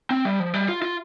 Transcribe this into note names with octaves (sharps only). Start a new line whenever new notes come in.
C4
G3
F3
G3
F4
F4